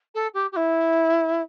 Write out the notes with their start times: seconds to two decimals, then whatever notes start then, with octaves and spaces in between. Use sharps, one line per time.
0.14 A4
0.34 G4
0.52 G4
0.56 E4